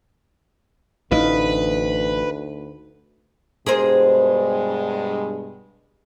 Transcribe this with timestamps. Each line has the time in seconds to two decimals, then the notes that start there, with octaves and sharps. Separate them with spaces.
1.11 A1 D2 E3 D#4 B4 D#5 F5
3.66 G2 B2 G#3 G#4 A#4 C5